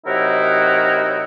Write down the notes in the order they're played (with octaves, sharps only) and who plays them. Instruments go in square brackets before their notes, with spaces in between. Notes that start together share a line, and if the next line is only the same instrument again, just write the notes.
[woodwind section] C3 F#3 D#4 E4 F#4 A#4